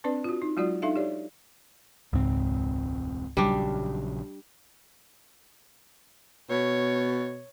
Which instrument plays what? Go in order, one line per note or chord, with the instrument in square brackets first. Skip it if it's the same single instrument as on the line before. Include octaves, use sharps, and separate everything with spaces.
[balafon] C4 D4 B4 D5
F4 F#4
D#4
F#3 G#3 F4 F#4 D5
D4 D#4 A4 E5 F5
G4 C#5 D5
[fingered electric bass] E1 C4 [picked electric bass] C#2 G#2
[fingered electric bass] A#1 C#3 F#3 [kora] G3 D4
[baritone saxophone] B2 [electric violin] C#5